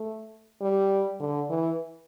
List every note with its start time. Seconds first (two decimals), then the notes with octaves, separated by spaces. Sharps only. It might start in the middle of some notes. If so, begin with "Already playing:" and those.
Already playing: A3
0.61 G3
1.20 D3
1.50 E3